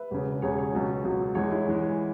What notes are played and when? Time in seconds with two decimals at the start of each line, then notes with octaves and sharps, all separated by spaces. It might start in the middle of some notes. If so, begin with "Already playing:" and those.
Already playing: B4 E5
0.11 E1 E2 C#3
0.42 E1 E2 C#3 G#4 C#5
0.58 G#4 C#5
0.73 C#2 B2 F#3
1.04 C#2 B2 F#3
1.35 E2 E3 G#3 G#4 C#5
1.51 E4 G#4
1.66 E2 E3 G#3